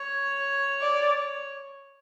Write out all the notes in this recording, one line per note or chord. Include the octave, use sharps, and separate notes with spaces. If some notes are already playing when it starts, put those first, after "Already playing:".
Already playing: C#5
D5